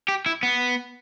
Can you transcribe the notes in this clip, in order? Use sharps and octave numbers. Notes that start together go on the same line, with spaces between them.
G4
E4
B3